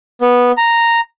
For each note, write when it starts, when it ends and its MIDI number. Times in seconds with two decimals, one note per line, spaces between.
0.21 0.52 59
0.57 1.00 82